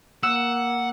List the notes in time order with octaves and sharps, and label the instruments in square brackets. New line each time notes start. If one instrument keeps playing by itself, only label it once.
[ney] A#3 [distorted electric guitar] F#5 [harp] E6